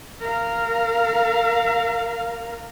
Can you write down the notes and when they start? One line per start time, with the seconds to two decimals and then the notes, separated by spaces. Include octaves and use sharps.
0.21 A#4 F5